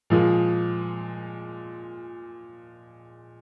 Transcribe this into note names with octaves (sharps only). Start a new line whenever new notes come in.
A#2 F3 G#3